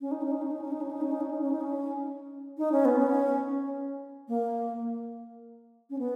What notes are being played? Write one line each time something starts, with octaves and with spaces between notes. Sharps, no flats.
C#4
D#4
C#4
D#4
C#4
D#4
C#4
D#4
C#4
D#4
C#4
D#4
C#4
D#4
C#4
D#4
C#4
D#4
C#4
B3
C#4
A#3
C#4
B3